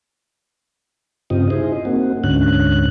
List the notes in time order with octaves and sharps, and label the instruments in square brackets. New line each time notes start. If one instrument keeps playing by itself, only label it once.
[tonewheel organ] G2 C#3 C4 F4 G4 D#5
D#4 E4 G#4 C5 D#5
A#3 C4 F#4
D2 G#2 D3 C#4 F#6